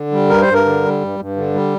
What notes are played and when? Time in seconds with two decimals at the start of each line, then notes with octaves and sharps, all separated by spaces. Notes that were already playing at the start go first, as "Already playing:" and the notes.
Already playing: D3
0.12 G3
0.30 G2 A#4
0.42 C5
0.47 G2
0.54 A#4
0.65 D3
0.83 G3
1.01 G2
1.19 G2
1.36 D3
1.54 G3